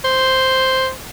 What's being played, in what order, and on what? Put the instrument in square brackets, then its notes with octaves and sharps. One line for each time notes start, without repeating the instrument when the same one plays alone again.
[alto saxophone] C5